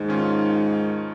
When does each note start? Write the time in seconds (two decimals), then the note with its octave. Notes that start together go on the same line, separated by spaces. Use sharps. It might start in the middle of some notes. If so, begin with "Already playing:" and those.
Already playing: D#2 G#2
0.08 D#3 C#4 F4